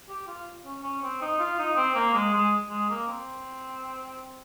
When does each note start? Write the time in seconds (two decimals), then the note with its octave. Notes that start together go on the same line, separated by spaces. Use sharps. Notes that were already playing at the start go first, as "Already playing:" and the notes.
0.09 G4
0.27 F4
0.65 C#4
0.83 C#4
1.02 C4
1.21 D#4
1.39 F4
1.59 D#4
1.76 C4
1.95 A#3
2.14 G#3
2.33 G#3
2.70 G#3
2.90 A#3
3.08 C4